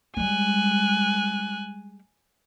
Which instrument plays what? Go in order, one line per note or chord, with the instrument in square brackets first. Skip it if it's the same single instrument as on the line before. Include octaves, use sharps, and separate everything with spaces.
[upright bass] G3 G#3 [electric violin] G#5 F#6